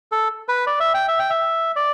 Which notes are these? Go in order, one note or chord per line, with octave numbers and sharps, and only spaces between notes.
A4
B4
D5
E5
G5
E5
G5
E5
D5